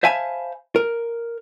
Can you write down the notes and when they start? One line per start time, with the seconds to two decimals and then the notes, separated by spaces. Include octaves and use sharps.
0.03 C5 E5 F5 G#5 A5 B5
0.76 A#4